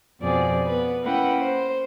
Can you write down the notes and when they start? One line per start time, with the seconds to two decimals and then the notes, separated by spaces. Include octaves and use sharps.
0.20 F2 B2 F3 G#4 D5
0.66 B3 B4
1.03 A#3 C#4 E4 B4 F#5 G5
1.41 C5